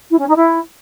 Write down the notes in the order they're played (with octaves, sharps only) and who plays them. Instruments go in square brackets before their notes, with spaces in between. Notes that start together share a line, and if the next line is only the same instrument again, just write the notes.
[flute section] E4
C#4
D#4
E4